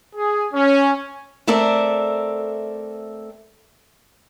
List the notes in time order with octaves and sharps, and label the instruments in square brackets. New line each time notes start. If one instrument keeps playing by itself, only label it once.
[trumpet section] G#4
C#4
[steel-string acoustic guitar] A3 C4 A4 A#4 D5 E5